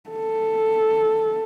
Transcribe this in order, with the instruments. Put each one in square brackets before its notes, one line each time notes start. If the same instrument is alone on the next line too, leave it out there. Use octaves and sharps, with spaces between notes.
[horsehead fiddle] A4